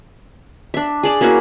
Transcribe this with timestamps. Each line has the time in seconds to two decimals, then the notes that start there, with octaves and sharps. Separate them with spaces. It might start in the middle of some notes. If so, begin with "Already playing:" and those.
0.74 D4 E5
1.03 G#4 D5 A5
1.21 A#3 C#4 E4 F#4